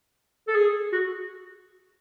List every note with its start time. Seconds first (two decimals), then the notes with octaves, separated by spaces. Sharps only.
0.48 A4
0.55 G#4
0.93 F#4